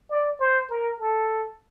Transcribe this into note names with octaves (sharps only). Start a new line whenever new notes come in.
D5
C5
A#4
A4